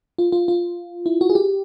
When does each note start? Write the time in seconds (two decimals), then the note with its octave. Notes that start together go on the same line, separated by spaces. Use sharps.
0.18 F4
0.32 F4
0.48 F4
1.06 E4
1.21 F#4
1.30 G#4
1.35 G4